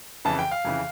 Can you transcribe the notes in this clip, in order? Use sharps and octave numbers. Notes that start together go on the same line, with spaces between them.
F2 C#3 E3 A5
G5
F5
F2 C#3 E3